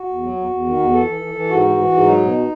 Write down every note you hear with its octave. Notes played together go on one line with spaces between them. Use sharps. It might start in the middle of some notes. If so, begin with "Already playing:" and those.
Already playing: F#4
E2
F#3
E2
E2
D#3
E2
E3 A4
E3
E3
E3
G#2 F#4
E3
E3
G#2
F#3 D#4
B2